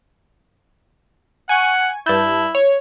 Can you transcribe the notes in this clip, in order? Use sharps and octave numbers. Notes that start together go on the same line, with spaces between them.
F#5 G#5 C#6
G2 E4 A5 G6
C#5